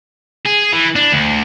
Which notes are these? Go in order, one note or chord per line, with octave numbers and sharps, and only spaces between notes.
G#4
E3
D4
D2